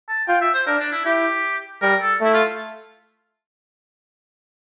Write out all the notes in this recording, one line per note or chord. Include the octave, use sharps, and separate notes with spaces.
A5
F4 G5
E5
C5
D4 A#4
D4
E4
E4 G4
G3 A#4
A4
A3 E4
F4